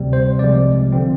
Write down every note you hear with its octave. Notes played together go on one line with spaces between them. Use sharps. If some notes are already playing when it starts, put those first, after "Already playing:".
Already playing: D2 C3 G3
C5
C2 C3 F3 G#3 D5
D3 F3 C4